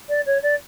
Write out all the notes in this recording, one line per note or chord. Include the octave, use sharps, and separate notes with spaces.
D5
C#5
D5